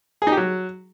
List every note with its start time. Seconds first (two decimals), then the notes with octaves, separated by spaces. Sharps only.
0.22 G#4
0.27 D#4
0.32 G4
0.37 F#3